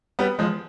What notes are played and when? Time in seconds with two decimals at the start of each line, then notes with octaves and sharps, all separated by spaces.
0.19 G3 B3
0.39 F3 G#3